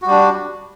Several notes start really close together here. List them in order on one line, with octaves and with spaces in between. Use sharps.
F#4 G3 D4